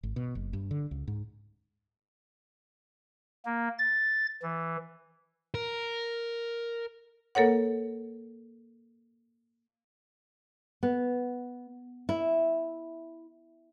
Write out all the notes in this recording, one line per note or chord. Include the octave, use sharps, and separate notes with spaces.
G#1
B2
F#1
G2
D3
C#2
G#2
A#3
A6
E3
A#4
A#3 A4 A#4 C#5 F#5
B3
E4